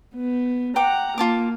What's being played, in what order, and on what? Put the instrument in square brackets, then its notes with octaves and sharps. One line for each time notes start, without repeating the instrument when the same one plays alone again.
[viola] B3
[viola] F#5 A#5 [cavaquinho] G5 D6
[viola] A#3 [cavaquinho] F4 A5 D6